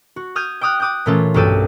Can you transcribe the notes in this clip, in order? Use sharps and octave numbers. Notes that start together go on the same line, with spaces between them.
F#4
D#6 F6 G6 G#6 D#7
G5 D6 D#6 F6 F#6
D6 D#6 F#6 G6
A#2 E3 A3 C#4 F4
B1 G2 F#4 G4 A4 D#7